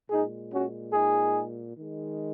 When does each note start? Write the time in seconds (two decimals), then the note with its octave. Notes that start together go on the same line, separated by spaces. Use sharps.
0.10 A#2 G#3 D#4 G#4
0.51 C#4 F#4
0.93 D#4 G#4
1.75 D#3 G#3